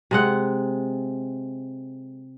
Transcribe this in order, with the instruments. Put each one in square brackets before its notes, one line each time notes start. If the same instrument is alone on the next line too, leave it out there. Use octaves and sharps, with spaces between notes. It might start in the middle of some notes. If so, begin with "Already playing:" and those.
[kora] C3 G#3 F#5